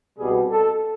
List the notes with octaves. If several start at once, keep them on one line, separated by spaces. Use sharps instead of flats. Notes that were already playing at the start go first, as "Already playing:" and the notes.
C2 B2 G3 G#4
A4